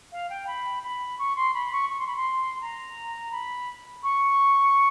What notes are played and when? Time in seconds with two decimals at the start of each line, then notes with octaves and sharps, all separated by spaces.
0.12 F5
0.30 G5
0.47 B5
0.83 B5
1.18 C#6
1.36 C6
1.54 B5
1.72 C#6
1.89 C#6
1.99 C6
2.07 B5
2.16 C6
2.61 A#5
3.32 B5
4.03 C#6